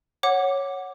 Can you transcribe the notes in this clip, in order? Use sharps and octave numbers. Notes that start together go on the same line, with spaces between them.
C#5 F#5 D6